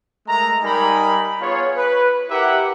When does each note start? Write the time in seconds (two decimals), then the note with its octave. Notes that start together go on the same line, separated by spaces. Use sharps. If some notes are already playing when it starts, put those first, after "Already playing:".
0.27 G#3 A3 A#4 A#5
0.63 G3 D#4 A#4 G#5 B5
1.41 B3 F4 G#4 C#5
1.76 B4
2.30 E4 G4 A#4 E5 F#5